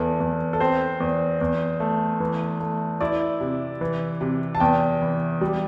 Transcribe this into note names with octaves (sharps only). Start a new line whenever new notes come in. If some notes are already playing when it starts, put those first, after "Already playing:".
Already playing: E2 E3 A4
E2
A4
C4 C5
E2
E2
A3
E3
A3
E4 D5
C3
E3
C3
A5
E2 G5
E3
G3